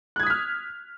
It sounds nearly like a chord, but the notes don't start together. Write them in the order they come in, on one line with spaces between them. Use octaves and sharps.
F#6 G#6 D#6 B6 F6